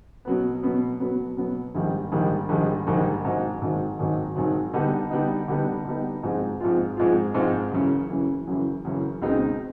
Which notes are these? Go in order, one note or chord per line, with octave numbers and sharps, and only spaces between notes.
B2 F#3 B3
B2 F#3 B3
B2 F#3 B3
B2 F#3 B3
A#1 G#2 D#3 G3
A#1 G#2 D#3 G3
A#1 G#2 D#3 G3
A#1 G#2 D#3 G3
G#1 G#2 D#3 F#3
G#1 G#2 D#3 F#3
G#1 G#2 D#3 F#3
G#1 G#2 D#3 F#3
D3 G3 B3 D#4
D3 G3 B3 D#4
D3 G3 B3 D#4
D3 G3 B3 D#4
G#2 F3 G#3 C4 F4
G#2 F3 G#3 C4 F4
G#2 F3 G#3 C4 F4
G#2 F3 G#3 C4 F4
F#2 C#3 E3
F#2 C#3 E3
F#2 C#3 E3
F#2 C#3 E3
C#2 B2 G#3 C4 D#4